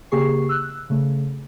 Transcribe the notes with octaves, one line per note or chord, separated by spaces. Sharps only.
C#3 A#3 G4 G#4 C#6 C7
E6 F#6
C#3 A3